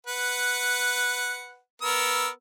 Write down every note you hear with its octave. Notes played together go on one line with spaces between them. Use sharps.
B4 F#5
B3 A#4 E6